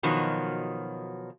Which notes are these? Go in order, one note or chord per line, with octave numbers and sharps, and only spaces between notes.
B2 D#3 F3 F#3